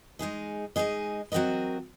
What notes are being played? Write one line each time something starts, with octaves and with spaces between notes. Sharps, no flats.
G#3 D#4 G#4 D#5
G#3 D#4 G#4 D#5
F#3 C4 F#4 A#4 D#5